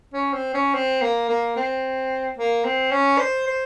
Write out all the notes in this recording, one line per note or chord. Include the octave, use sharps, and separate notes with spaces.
C#4
C4
C#4
C4
A#3
A#3
C4
A#3
C4
C#4
C5
C5